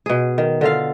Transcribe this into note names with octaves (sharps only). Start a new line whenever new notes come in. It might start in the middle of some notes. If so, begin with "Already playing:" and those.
B2 G#4
D#3
D3 F4 F5